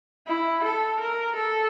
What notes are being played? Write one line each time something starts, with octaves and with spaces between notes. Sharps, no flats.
E4
A4
A#4
A4